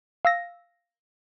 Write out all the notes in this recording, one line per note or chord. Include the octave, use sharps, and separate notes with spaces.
F5 E6 A#6